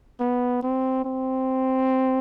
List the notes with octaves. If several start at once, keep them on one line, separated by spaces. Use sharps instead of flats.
B3
C4
C4